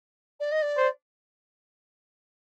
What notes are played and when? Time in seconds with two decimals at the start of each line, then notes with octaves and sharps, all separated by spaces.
0.40 D5
0.51 D#5
0.62 D5
0.77 C5